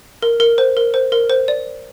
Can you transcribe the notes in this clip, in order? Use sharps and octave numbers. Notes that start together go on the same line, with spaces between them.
A#4
A#4
C5
A#4
C5
A#4
C5
D5